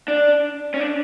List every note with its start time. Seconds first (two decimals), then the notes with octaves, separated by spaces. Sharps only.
0.08 D4
0.74 C#4
0.80 D4